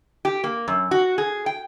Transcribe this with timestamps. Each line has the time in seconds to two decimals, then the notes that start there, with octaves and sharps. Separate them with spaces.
0.25 G4
0.44 A#3
0.68 F#2
0.91 F#4
1.18 G#4
1.46 G5